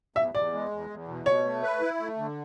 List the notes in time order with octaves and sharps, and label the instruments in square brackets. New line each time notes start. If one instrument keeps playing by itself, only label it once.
[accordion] E2 [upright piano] E5
[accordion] E2 [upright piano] D5
[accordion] G#3
E2
E2
B2
[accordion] B2 [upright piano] C#5
[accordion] A3
B4
E4
A3
D3